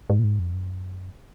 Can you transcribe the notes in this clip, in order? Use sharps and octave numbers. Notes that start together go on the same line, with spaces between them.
G#2
A#2
G#2
F2
F#2